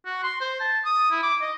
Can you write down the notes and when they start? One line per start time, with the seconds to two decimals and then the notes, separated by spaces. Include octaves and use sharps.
0.05 F#4
0.23 C6
0.41 C5
0.60 A5
0.85 D#6
1.11 E4
1.23 D6
1.41 D#5